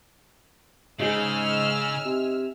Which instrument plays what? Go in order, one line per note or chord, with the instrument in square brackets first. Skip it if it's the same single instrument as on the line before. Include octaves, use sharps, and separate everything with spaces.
[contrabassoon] G#2 [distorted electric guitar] C#3 [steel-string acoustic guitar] D#4 G#4 [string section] G#5 E6 F6
[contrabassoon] C3